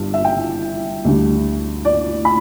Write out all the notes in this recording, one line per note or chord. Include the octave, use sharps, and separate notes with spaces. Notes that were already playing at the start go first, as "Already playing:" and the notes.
Already playing: G1 G2 G3
E5
G5
D2 D3 G3
D5
B5